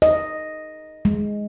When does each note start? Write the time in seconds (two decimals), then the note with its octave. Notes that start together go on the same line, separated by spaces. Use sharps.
0.02 D#5
1.05 G#3